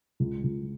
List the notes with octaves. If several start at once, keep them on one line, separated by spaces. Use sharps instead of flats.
C#2
C#2